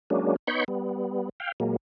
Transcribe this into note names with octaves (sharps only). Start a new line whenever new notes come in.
F#3 G#3 A#3 C#4 D4
B3 D#4 C#5 B5 C#6 G6
G3 B3
F5 G5
A#2 F#3 G#3 A#3